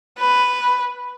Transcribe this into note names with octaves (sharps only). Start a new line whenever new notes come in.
B4